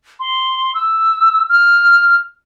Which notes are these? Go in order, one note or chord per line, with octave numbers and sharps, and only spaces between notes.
C6
E6
F6